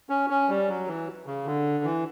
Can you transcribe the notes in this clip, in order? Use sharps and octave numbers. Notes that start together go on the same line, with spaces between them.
C#4
C#4
G3
F#3
E3
C#3
D3
E3